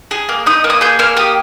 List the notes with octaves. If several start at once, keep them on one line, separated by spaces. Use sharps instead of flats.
G#4
A#3
D#4 D#6
A#3
D#6
G#4 G6
A#3 F6
G4 D#6